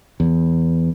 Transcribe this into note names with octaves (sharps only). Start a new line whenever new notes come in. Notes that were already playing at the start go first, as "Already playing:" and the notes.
E2